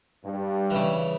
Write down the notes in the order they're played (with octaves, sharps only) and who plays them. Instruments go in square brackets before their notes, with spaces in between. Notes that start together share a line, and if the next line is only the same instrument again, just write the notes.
[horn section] G2
[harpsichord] C#3 E3